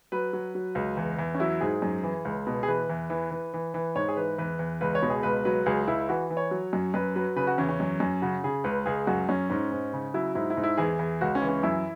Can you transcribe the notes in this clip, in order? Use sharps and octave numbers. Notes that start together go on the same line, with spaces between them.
F#3 B4
F#3
F#3
C#2
E2
E2
C#4
F#3 E4
G#2 G#4
F#2
E3
C#2
B2
G#4
E3 B4
E2
E3
E3
E3
E3
G#2 C#5
G#4
E3 B4
E2 B4
E2
C#2 B4
C#5
B2
G#4
C#2 B4
F#3 B4
C#2 G#4
C#2 E4
E3 F#4
E3
C#5
F#3
F#2
F#2 B4
F#3 B4
C#3 B4
F#4
E2 C#4
C#4
F#2
F#2
C#3 F#4
C#3 G#4
C#2 B4
C#2 G#4
F#2 F#4
F#2 C#4
G#2 C#4
G#2
C#3
F#3 E4
G#2 E4
E4
G#2
E4
E2 G#4
E2
C#2 F#4
C#4
E3
C#4
F#2 E4